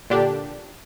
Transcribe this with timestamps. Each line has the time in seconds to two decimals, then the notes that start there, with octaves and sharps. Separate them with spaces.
0.10 A#2 D3 D4 G4